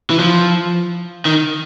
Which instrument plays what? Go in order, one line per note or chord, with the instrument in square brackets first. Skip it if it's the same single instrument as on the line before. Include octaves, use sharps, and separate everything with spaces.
[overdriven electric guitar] E3
F3
D#3